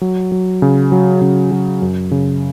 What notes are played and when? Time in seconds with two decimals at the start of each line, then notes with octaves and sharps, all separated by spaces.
0.01 F#3
0.32 F#3
0.62 C#3
0.92 F#3
1.22 C#3
1.52 F#3
1.82 F#2
2.11 C#3